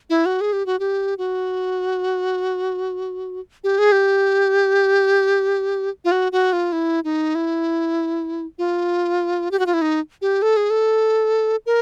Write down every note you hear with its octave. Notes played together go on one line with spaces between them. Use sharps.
E4
F#4
G#4
G4
F#4
G4
F#4
G4
G#4
G4
F4
F#4
F#4
F4
E4
D#4
E4
F4
G4
F#4
F4
E4
D#4
G4
A4
G#4
A4
A#4